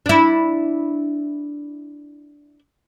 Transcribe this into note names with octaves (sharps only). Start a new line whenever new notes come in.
D4 E4